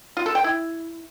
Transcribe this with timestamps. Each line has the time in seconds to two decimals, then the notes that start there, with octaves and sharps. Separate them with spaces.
0.17 F4
0.26 A4
0.35 G5
0.44 E4